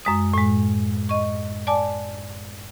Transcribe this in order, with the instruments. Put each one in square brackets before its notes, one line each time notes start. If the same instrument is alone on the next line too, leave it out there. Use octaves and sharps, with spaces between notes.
[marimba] F#2 G#3 D#6
A2 G#3
D#5 C#6
D5 G#5 A5 D6